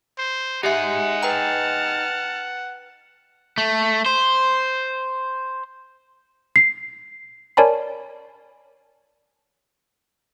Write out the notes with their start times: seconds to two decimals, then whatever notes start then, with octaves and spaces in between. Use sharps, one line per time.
0.18 C5
0.63 D#4 G4 G#4 E5 F#5
1.23 B4 G5 A5 A#5 F6
3.58 A3
4.06 C5
6.56 C7
7.57 A#4 C#5 D5 G#5 A5 B5